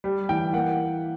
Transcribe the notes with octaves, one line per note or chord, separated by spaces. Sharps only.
G3
E3 G5
A#3 F#5